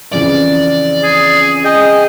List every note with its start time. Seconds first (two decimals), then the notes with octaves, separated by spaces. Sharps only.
0.13 F2 C#3 E3 D5
1.03 G#4
1.64 G#4 D#5 G5